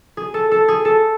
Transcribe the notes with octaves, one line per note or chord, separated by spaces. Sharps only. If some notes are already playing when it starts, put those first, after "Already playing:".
G#4
A4
A4
G#4
A4